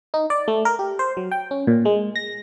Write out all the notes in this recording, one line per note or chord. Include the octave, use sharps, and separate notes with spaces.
D#4
D5
A3
A#4
G4
C5
F#3
G5
C#4
A#2
G#3
A#6